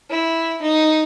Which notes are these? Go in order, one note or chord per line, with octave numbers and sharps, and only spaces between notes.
E4
D#4